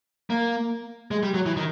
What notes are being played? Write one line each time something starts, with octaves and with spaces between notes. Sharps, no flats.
A#3
G#3
G3
F#3
E3
D#3